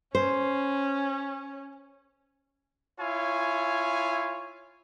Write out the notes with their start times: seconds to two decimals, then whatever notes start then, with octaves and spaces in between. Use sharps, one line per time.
0.15 C#4 C5
2.99 E4 F4 C#5 G#5